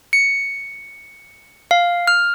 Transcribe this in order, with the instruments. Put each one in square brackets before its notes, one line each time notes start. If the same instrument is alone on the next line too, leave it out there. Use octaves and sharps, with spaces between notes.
[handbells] C#7
F5
F6